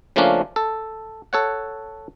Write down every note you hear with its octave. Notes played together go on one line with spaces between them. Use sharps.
C#3 F3 A3 A#3 C#4 D4
A4
A4 C#5 F#5